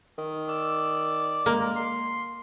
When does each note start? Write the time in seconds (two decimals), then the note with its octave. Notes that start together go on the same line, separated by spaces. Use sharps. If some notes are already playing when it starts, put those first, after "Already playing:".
0.18 D#3
0.49 D5 E6
1.46 G#3 A#3
1.76 C6